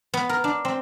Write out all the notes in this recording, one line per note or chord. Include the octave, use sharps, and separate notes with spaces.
B3
A#4
D4
C4